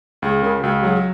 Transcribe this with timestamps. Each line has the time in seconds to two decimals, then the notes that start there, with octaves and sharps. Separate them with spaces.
0.22 C#2 G#4
0.43 C#3 A#4
0.63 C#2 F#4
0.83 F#3 G#4
0.95 F#4